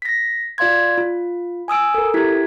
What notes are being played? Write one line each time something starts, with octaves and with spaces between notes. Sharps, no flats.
A#6 B6
F4 D5 F5 C6 G#6
F4
G#5 D#6 E6 D7
A4 A#4
E4 G4 G#6 B6